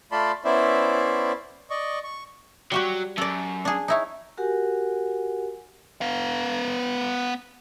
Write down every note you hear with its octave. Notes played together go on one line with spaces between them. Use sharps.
A3 F4 D5 A5 B5 C6
B3 C#4 E4 C5 D5 E5
D5 D#5 C#6
C#6
F#3 G3 F#4 G4
F#2 A4 D5
D4 G#4
D#4 E4 C#5
F#4 G4 A#4 F#5 G#5
B3 F5